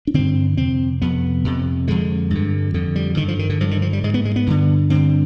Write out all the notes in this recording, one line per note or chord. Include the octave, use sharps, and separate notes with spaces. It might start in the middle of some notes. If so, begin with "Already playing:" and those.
D4
G2 D3 C4
F2 C3 C4
F2 C3 B3
F2 C3
F2 D3 G#3
G2 D3
F2 D3
G3
G2 D3 D#3
F3
D#3
D3
G2 D3 F3
D#3
F3
G3
G#2 G#3
B3
G#3
B3
G2 D3
G2 D3 C4